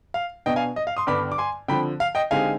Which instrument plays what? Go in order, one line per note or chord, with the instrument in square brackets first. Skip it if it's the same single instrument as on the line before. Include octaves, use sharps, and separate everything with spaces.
[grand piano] F5
[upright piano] B2 B3 D4 [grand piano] D#5 G5
[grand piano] F5 G#5
D#5
F5
C6 D#6
[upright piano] G2 D3 G3 B3 [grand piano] B5 D6
[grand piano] D6
G#5 C6
[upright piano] D3 F3 C4 [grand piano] G5 B5
[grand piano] F5
D#5 G5
[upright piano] D3 G#3 C4 D#4 G4 [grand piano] F5 G#5